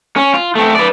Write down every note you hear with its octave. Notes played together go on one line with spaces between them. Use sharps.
C#4
F4
A3 C4
B4 D5